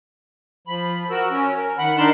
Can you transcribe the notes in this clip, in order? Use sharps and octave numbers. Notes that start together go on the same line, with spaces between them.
F3 B5
F#4 A#4 E6
C#4
A#4
D#3 F#5 B5
D4 D#4 A#4 A5 B5 C6